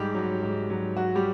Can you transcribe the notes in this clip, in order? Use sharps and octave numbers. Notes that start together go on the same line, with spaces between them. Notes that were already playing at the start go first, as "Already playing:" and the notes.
Already playing: G#2 G3 G4
F#3
G#2
F#3
F#3 F#4
G3 G4